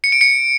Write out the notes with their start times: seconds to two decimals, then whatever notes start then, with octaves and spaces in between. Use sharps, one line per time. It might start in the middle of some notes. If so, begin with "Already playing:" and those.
0.04 C#7
0.12 D7
0.21 C#7